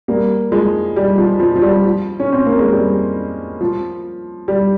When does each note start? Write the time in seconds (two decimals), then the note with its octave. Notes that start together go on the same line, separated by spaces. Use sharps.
0.08 G3 A#3
0.52 F3 G#3
0.96 G3
1.18 F3
1.39 F3
1.55 F3
1.62 G3
1.84 F3
2.20 C#4
2.33 C4
2.46 A#3
2.59 G#3
2.72 G3
3.61 F3
4.48 G3